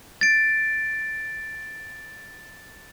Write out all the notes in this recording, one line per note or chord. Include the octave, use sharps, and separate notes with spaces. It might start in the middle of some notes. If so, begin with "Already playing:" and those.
A6 D7